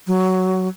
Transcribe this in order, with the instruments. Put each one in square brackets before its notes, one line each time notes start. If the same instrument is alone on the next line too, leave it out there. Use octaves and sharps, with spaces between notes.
[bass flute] F#3